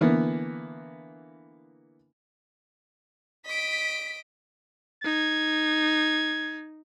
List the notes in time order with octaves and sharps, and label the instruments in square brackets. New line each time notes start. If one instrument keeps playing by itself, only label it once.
[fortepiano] D3 E3 A#3 B3
[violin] D#5 D7 [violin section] B6
[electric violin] D#4 [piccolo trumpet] G#6